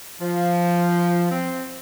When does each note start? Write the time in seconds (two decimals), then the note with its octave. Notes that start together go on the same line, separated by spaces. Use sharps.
0.20 F3
1.31 C4